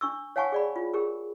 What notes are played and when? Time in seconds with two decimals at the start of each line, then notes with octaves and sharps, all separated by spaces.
0.01 D4 C#6 E6
0.36 C#5 F5 F#5 G#5 A5 C#6
0.52 G#4 D5 B5
0.76 F4
0.94 G4 G#4 A#4